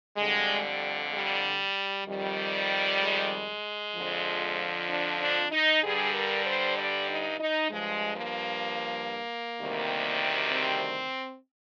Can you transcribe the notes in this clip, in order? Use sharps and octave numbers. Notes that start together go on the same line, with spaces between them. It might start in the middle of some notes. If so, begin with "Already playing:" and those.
F2 D3 G3 G#3
G3
F2 D#3 G3
G#3
F2 D3 F3
D4
D4
D#4
G2 D3 G3 G#4
A#4
C5
D5
D#4
D#4
G2 F3 G#3
A#3
D2 C3 D#3 G3
C4